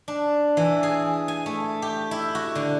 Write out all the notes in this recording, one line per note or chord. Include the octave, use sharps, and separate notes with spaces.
D4
E3
G#4
G#5
A3
G4
E4
F#4
D3